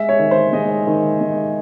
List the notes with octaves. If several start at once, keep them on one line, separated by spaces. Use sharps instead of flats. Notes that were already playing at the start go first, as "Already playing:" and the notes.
Already playing: G#3 E5
C#5
D#3
C5
G#3 D#5
D#3
G#3